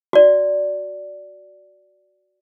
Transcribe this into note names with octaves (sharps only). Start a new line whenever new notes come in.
F#4 D5